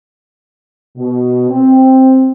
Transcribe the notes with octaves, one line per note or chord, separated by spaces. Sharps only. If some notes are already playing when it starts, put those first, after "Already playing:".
B2
C4